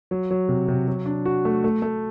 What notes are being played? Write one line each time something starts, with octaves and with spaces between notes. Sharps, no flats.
F#3
F#3
C3
C3
F#3
D4
F#4
A3
A3
A3